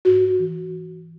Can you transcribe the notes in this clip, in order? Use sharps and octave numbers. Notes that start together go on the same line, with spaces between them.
G#2 F#4
E3